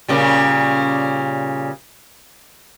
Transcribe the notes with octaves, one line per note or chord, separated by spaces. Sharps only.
A#2 C#3 G3